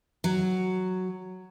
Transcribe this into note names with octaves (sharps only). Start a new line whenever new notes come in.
F#3